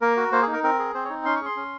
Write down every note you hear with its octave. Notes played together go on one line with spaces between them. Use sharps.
A#3 A#4
F#4
A#3 C5
G#4
D#4
A#4
C4 A#4
G#4
C4 C5
C#5
D#4
C#4 C6
C#6
G#4 C6
C#4